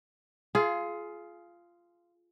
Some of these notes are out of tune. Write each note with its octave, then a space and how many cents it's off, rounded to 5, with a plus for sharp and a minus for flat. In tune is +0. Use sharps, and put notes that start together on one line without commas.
F4 -10 G#4 +20